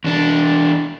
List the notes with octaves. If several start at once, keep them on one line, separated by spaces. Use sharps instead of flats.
E2 D4